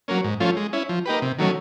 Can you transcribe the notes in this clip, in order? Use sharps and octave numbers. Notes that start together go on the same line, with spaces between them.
F#3 A#3 C#4
G#2
F3 A3 C#4 F4
G#3
C#4 E4
F3
A#3 D#4 G4 B4
C3
D#3 F#3 A3 C#4